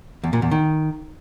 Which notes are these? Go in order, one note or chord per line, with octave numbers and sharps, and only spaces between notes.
E2
A#2
E2
D#3